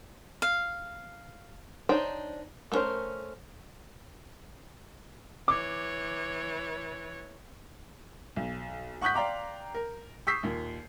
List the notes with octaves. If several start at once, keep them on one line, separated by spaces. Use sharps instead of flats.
F5
D4 D#4 C5 C#5 G5
A3 B3 C#4 A#4 C5
E3 C#5 D6
B1
F#5 C#6 D#6 F#6 G6 B6
D5 F5 G5 A#5 C6 D6
A#4
C#6 D#6 E6 G6 B6 C7
D#2 A#2